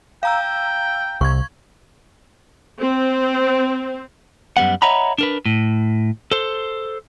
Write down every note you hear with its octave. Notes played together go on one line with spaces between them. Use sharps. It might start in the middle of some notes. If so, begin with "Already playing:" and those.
F5 G5 A#5 E6
C2 C#6 G#6
C4
F#2 G3 B3 F#5
C#5 D#5 E5 F#5 A#5 B5
D4 A#4 B4
A2
A4 C5